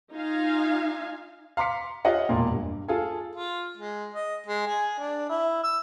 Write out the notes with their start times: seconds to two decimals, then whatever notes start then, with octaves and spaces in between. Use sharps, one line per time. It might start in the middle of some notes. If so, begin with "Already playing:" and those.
0.12 D#4 F4 F5 G#5
1.57 F5 A#5 C6 D6 B6 C#7
2.05 F4 G4 C#5 D#5 F#5
2.29 E1 A#2 A#3
2.51 G2
2.88 F4 G#4 A4 G#5
3.35 F4
3.77 G#3
4.14 D#5
4.46 G#3
4.67 G#4
4.99 D4
5.29 E4
5.63 E6